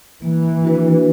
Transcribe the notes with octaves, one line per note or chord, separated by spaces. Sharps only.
E3 A#3
D4 F#4 B4